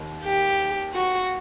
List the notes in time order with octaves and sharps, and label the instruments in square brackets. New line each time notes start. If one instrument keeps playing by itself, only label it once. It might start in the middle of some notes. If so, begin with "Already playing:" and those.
Already playing: [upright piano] D#2 D#3
[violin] G4
F#4